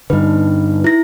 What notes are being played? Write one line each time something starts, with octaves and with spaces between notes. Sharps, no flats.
G2 D3 D#4 B4
E4 A#6